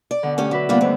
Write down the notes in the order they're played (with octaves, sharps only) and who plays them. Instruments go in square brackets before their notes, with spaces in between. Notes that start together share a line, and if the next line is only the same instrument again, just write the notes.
[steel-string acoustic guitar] D5
[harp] B2 D3
[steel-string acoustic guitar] A3 C#4 G4
[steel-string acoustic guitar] F#3 [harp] B4 E5 D6
[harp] G2 B3 D4 [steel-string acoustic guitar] A#3 F4
[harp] D#2 A3 [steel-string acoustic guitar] C4